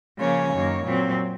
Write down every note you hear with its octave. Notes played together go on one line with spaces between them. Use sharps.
C#3 F3 A#3 C#4 C#5
F#2 D#3 A#3
A#2 F#3 C4